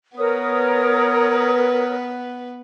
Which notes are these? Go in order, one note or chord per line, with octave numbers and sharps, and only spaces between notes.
B3 A#4 B4 C#5 D#6